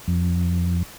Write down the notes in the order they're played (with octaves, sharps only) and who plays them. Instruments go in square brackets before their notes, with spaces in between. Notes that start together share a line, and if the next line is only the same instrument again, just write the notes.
[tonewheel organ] F2